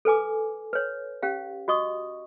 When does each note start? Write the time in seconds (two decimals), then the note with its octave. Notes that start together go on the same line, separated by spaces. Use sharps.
0.05 A4 B4 G#5 D6
0.73 B4 C#5
1.23 C#4 G4 F5
1.68 F#4 D#5 C#6 D#6